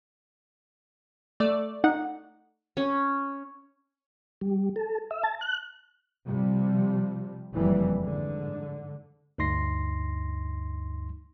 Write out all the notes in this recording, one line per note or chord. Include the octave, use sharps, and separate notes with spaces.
A3 D5
D#4 F#5
C#4
G3
A4
E5
A5
F#6
C3 F3 G3
F#1 F2 E3 G3
G#2 D3
D2 G2 D#4 C6 A#6 C7